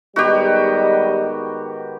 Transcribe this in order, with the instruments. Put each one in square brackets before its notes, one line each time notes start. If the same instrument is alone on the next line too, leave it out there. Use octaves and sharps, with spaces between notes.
[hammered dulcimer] G#2 D#3 B3 [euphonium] G3 [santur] F#4 G4 [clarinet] D#5